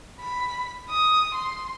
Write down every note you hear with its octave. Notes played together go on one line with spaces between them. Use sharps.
B5
D#6
C6